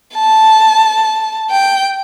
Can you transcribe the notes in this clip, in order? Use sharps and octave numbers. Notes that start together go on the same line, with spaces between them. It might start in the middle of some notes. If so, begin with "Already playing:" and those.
A5
G5